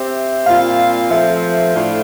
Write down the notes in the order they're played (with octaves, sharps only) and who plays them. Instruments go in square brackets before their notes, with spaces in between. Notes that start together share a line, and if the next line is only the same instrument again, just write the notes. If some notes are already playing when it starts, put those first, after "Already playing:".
Already playing: [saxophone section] C4 G4 C5 [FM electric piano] E5
[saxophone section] A#2 G3 C4 F4 [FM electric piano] F5
[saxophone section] F3 A3 C4 [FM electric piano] E5
[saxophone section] A2 F3 A3 D4 F4